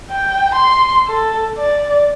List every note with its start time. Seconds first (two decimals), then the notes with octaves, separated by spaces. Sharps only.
0.11 G5
0.55 C6
1.07 A4
1.58 D5